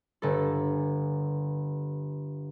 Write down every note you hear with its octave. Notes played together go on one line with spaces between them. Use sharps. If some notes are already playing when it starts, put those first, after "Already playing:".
G1 A4